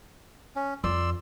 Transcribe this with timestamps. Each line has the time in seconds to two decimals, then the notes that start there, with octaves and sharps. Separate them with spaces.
0.56 C#4
0.84 F2 D5 C6 E6